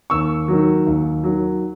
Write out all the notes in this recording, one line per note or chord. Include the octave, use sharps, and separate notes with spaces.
D#2 C#6 E6
D#3 F#3
D#2
D#3 F#3